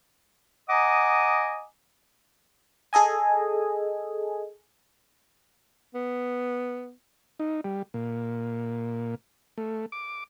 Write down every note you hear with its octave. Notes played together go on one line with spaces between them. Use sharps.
D#5 F#5 G#5 A#5 D6 D#6
G#4 A4 D#5 G#5
B3
D#4
G3
A#2
A3
D6